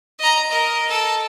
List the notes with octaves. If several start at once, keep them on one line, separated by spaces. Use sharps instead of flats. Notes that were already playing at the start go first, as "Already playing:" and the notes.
D#5 A#5
A#4 D#5
A4